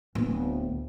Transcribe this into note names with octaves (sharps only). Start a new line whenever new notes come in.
D1 B3